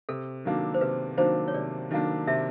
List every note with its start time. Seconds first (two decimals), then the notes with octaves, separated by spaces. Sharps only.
0.09 C3 A4
0.45 D#3 F#3 A#3 D4
0.74 C5
0.81 C3 B4
1.17 D#3 F#3 A#3 D4 C5
1.48 C#5
1.54 C3 D5
1.91 D#3 F#3 A#3 D4 D#5
2.27 C3 E5